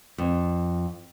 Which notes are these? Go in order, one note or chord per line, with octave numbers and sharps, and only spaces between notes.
F2